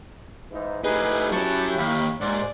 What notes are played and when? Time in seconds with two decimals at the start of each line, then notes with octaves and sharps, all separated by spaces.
0.51 G#2 E3 D#4
0.84 A3 D#4 E4 G4 G#4 B4
1.32 F#3 C#4 A5 C#6
1.78 D#2 F5 B5
2.21 D#2 G#2 D5